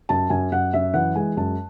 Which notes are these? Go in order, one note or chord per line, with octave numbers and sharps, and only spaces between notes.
F#2 A5
F#2 G#5
F#2 F#5
F#2 E5
E3 F#5
G#3 G#5
F#2 A5